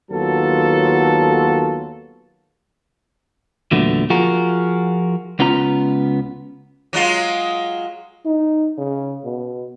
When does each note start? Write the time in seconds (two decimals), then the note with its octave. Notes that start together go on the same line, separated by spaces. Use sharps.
0.11 D#2 F#3 B3 F4 A4
3.71 E2 A#2 D3 F#3 A3 B3
4.10 F3 F4 F#4 G#4 A#4
5.39 C#2 B3 C#4 F4 A#5
6.93 F#3 G#3 F4
8.26 D#4
8.78 C#3
9.24 B2